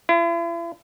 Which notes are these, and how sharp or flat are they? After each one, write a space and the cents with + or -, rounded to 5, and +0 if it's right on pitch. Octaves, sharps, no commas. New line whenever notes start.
E4 +45